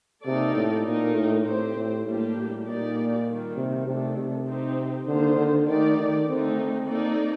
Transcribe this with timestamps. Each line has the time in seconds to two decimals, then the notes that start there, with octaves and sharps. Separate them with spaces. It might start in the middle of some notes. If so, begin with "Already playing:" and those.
0.25 C3 A#3 D#4 A4 D5
0.55 A2
0.86 A#2 A3 D#4 A#4
1.16 A2
1.45 A2 C4 G4 C5
1.77 A2
2.06 A2 G3 A#3 D4 G4
2.37 A2
2.66 A#2 A#3 D#4 G4 D5
3.27 D#3 G3 A#3
3.56 C3
3.87 C3 D#3 A3 D4 A4
4.18 C3
4.47 C4 D#4 G4
5.07 D3 D#3 A#3 F4 C5
5.37 D3
5.68 D#3 A3 D#4 G4 D5
5.98 D#3
6.28 D3 A3 C4 D#4
6.88 A#3 D#4 A4 D5